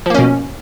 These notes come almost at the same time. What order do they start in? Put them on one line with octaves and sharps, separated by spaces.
F3 A#3 C#4 B2